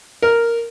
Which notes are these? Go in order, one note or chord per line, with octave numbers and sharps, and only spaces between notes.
A#4